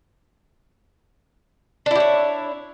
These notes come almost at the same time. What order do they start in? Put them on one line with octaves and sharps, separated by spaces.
D4 E4 G4 C#5